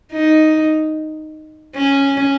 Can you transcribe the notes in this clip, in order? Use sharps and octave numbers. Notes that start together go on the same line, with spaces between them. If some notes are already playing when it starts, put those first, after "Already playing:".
D#4
C#4